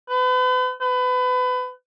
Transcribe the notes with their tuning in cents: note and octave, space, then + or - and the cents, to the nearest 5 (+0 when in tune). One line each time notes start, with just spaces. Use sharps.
B4 +40
B4 +30